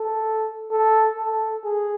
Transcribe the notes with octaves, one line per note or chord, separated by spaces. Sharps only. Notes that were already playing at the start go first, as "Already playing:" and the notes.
Already playing: A4
A4
A4
G#4